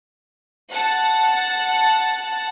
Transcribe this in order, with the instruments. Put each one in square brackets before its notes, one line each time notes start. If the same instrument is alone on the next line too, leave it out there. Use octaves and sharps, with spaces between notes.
[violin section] F#5 A5